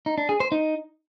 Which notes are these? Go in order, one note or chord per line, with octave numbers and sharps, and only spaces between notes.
D#4
D4
G#4
C5
D#4